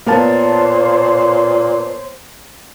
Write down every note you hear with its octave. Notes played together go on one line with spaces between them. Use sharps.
A#2 A#3 B3 C5 C#5 A5